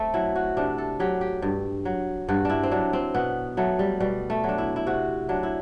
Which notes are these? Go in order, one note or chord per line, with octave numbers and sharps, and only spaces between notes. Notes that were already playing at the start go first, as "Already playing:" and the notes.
Already playing: A3 C4
F#3 E4
F#4
C3 D4
A4
F#3 G4
G4
G2
F#3
G2 F#4
D4 E4
C4
F#3 D4
C4
B2 B3
F#3 A3
G3
B2 G3
A3
F#3
D4
E4
E4
C3 F#4
F#3 D4
E4